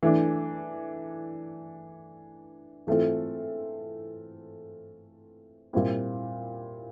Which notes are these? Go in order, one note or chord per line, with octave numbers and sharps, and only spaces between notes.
E3 A3 D4
E3 A3 C4 F4 A4
A#2 G3 C4 E4